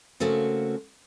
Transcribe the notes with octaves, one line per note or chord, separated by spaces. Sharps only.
C#3 A3 A#3 C4 F#4